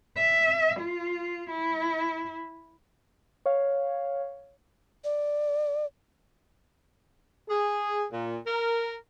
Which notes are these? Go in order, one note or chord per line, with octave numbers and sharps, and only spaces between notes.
E5
F4
E4
C#5 F5
D5
G#4
A#2
A#4